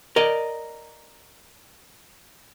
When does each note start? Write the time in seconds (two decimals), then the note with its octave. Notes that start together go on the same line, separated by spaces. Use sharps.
0.16 A#4 D5 D#5